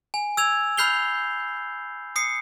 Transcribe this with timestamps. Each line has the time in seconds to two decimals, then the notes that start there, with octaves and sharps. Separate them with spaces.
0.14 G#5
0.37 E6 G#6 F7
0.77 B5 F6 G6 C7 F7 G7
2.16 D#6 C7 C#7